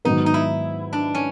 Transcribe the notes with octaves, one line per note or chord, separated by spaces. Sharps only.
G#2 D#3 F#3 B3 D#4
D#4
E4
D4
C#4